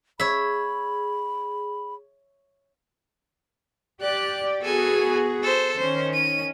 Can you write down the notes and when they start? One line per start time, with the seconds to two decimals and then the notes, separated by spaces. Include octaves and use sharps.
0.20 G#4 C#5 E5 B5
4.02 G4 D5 F#6
4.62 B3 F#4 G#4 A4 G#5
5.43 A4 C5
5.77 D#3 C#4 C5
6.13 D#7